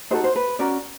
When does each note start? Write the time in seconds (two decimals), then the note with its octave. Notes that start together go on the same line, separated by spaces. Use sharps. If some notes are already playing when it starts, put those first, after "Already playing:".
0.11 D#4 F#4 A4 C5
0.24 C5
0.36 B4
0.59 C#4 F#4 A#4 D5